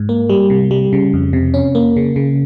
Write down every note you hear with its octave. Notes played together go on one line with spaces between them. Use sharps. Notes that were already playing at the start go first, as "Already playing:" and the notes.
Already playing: G#2
A#3
G3
C3
G3
C#3
F2
C3
C#4
A#3
C#3
C#3